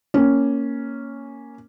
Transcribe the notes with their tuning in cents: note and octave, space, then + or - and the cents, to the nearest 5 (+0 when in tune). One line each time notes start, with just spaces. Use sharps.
A#3 +0 C#4 +0